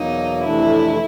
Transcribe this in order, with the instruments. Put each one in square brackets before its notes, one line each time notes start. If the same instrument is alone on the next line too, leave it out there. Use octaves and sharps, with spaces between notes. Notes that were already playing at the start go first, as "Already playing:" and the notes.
Already playing: [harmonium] E2 B2 F#3 A#3 [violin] D#4
[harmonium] F2 C3 E3 A3 D4 [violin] E4